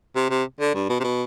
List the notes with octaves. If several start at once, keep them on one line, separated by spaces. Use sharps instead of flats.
C3
C3
D3
G2
B2
C3
B2